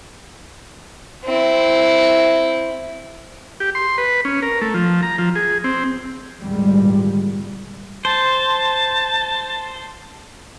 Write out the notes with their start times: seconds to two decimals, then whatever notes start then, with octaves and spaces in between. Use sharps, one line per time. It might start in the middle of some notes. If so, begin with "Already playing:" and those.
1.25 C4 E4
3.60 G4
3.75 C6
3.98 B4
4.25 C#4
4.42 A#4
4.62 A3
4.74 F3
5.03 A#5
5.18 F3
5.36 G#4
5.64 C4
6.41 G#1 E2 A#2 D3 G3 G#3
8.05 C5 A5